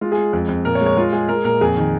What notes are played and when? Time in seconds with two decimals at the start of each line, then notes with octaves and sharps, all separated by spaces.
0.01 G#3 F4
0.12 G#4
0.18 G#3
0.33 F2
0.49 F2
0.65 A#2 A#4
0.75 C#5
0.81 G#3
0.86 C#5
0.97 G#3 F4
1.13 G#3 G#4
1.28 G#3 A#4
1.45 A#2 A#4
1.61 F2 G#4
1.77 D#3